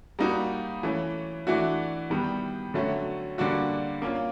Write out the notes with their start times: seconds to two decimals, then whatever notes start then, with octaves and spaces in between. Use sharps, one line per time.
0.19 G3 A#3 D#4 F#4
0.83 E3 A3 C#4
1.47 E3 A3 D4 F#4
2.10 D#3 G3 B3
2.74 D3 F#3 A3 C#4 F#4
3.38 D3 G3 A#3 D4 F#4
4.02 A#3 C#4 F4